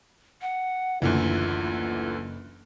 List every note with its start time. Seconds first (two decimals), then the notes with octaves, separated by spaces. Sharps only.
0.42 F#5
1.02 F#1 D2 D3 E3 F4